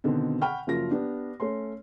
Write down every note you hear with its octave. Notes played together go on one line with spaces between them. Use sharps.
B2 D3 D#3 C4
F#5 G5 B5 C#6 F6
F#1 F3 F#3 F4 A#4 A#6
B3 D4 G4
A3 C#4 C6